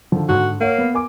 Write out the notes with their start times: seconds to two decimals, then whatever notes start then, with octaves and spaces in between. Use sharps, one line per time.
0.12 D3 D#3 F3
0.29 G#2 D3 F#4
0.61 A#3 C#5 F#5
0.78 B3
0.94 A#4 G#5 D6